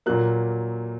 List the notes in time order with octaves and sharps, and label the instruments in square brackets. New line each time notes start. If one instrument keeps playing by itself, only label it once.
[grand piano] A#2 F#3 A#3 F#6